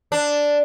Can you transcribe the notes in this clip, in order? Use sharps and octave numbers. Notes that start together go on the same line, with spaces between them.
D4